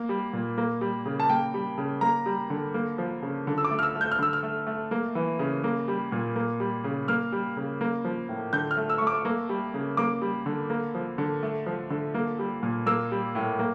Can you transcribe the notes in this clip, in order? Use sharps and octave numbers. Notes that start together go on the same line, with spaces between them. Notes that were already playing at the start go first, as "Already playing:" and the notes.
Already playing: A#3
G3
A#2
A#3
G3
C#3
A5
A#3 G5
G3
C#3
A#3 A#5
G3
D3
A#3
F3
C#3
D3
E6
D6
A3
F6
E6
A3
G6
F6
D3 E6
F6
A3
A3
A#3
E3
C#3
A#3
G3
A#2
A#3
G3
C#3
A#3 F6
G3
C#3
A#3
F3
A2
D3 G6
F6
A3
E6
A3 C#6
D6
A#3
G3
C#3
A#3 D6
G3
D3
A#3
F3
D3
A3
F3
D3
A#3
G3
A#2
A#3 E6
G3
A2
A#3